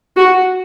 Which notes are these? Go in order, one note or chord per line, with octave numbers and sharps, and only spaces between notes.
F#4